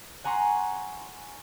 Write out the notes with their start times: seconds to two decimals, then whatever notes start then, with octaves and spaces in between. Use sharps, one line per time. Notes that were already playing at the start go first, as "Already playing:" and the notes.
0.24 F#5 G#5 A#5 C6 C#6